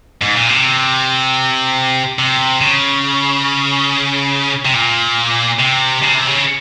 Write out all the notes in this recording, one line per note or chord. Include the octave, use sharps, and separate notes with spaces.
G#2
A#2
C3
C3
C#3
C3
A#2
C3
C#3
C3
C#3